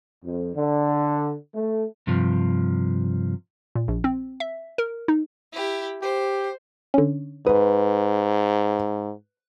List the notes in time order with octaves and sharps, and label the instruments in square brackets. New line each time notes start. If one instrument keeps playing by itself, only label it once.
[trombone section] F2
D3
A3
[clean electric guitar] G2 C3 F3
[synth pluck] A#2
A#1
C4
E5
A#4
D#4
[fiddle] E4 G4
[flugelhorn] G4 [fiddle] C5
[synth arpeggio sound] D3 C#4
[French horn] G#2 [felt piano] B4 [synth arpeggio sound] D#6